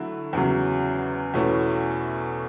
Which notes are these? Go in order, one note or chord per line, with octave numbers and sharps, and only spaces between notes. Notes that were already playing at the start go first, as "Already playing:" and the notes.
Already playing: D3 F#3 A3 E4
E2 C#3 F#3
E2 B2 A3 C#4 E4